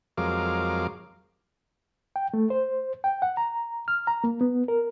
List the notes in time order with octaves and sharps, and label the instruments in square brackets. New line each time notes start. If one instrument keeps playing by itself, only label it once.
[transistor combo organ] F2 F#3 G#3 A#4 F5 D6
[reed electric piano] G5
A3
C5
G5
F#5
A#5
F6
A#5
A#3
B3
A#4